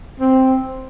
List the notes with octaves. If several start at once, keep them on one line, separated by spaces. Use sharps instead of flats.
C4